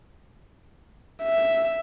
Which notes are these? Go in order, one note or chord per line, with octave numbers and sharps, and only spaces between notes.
E5